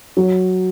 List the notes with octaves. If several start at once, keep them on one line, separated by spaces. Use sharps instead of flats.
F#3